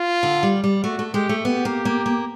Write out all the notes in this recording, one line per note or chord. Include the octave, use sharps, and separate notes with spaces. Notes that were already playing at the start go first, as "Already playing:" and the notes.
Already playing: F4
D3
G3
G3
A3 F#4
A3
G#3 G4
A3
B3 G4
A#3
A#3
A#3